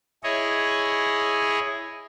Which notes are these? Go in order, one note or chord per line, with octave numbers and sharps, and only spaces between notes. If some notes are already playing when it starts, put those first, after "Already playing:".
E4 G#4 C#5 D#5